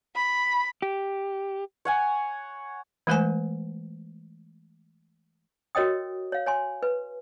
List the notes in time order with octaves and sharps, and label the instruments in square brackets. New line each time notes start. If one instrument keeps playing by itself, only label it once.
[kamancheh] B5
[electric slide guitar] G4
[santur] C#5 F#5 G#5
[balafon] E3 G#3 A3 C5 E5 G#5
[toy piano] F#4 A#4 C#5 D#5 G5 D#6
C#5 F5
C#5 G#5 C6
B4